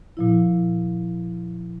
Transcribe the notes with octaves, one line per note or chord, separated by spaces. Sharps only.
A#2 F3 E4